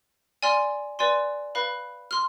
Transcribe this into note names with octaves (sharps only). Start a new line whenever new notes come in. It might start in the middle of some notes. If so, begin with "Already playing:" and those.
D5 G#5 C6 F6
B4 D5 G#5 C6
B4 F5 B5
C6 F6